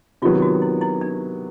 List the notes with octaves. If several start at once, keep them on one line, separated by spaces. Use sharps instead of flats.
C3 D#3 F#3 B3 F4
F#4
E4
E4
D4